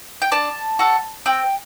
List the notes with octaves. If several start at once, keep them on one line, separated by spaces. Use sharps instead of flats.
G5
D4 A5
F#4 A4
C4 G5